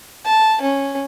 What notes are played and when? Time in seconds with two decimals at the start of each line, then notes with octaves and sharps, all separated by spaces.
0.24 A5
0.61 C#4